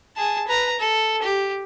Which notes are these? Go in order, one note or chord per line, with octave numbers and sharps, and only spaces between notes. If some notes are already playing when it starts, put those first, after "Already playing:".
G#4 A5
B4 A#5
A4
G4